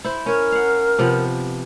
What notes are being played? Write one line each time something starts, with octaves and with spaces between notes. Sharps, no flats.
E4 C5
C#4 A#4 C#5
F5 F#5
C3 F3 B3